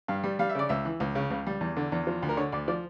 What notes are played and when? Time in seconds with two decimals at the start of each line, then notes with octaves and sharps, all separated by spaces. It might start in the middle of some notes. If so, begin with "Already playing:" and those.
0.08 G2 F5
0.24 G3
0.39 G3 F5
0.49 E5
0.55 C#3 D5
0.69 C#2 E5
0.85 E3
1.00 C#2
1.15 C#3
1.30 C#2
1.47 G3
1.61 E2
1.77 D3
1.92 E2
2.07 F3
2.22 D2
2.29 A#4
2.37 D3 C#5
2.52 D2 D5
2.68 F3 D5